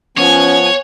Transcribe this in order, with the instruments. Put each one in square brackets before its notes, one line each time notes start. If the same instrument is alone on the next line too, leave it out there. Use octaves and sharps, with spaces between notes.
[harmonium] F3 B3 [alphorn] C#4 [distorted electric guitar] C#5 [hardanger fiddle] F#5 G#5